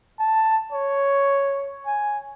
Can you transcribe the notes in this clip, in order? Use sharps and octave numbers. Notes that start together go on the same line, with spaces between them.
A5
C#5
G#5